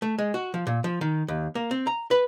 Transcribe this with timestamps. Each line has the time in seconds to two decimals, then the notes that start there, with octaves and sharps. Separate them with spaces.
0.02 A3
0.18 G#3
0.34 F#4
0.54 F3
0.67 A#2
0.84 F3
1.01 D#3
1.28 D#2
1.55 A#3
1.71 C4
1.87 A#5
2.11 B4